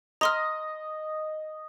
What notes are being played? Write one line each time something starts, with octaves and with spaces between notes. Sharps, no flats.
D#5 A#5 C6 F6